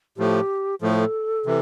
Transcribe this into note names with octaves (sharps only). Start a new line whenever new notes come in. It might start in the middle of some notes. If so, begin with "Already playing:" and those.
A2 F3 A3 G4
A2 F3 A3 A4
C3 E3